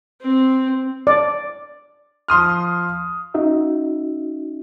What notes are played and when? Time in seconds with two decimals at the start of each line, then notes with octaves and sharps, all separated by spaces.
0.22 C4
1.07 D5
2.28 F3 C6 D#6 F6
3.34 C#4 D#4 F#4 E5